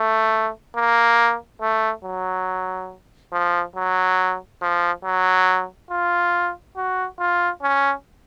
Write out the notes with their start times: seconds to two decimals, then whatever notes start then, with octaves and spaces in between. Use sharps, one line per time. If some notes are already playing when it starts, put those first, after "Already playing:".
Already playing: A3
0.75 A#3
1.61 A3
2.04 F#3
3.32 F3
3.76 F#3
4.62 F3
5.04 F#3
5.91 F4
6.76 F#4
7.20 F4
7.62 C#4